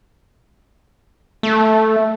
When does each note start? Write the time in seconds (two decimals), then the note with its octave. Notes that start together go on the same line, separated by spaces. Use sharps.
1.43 A3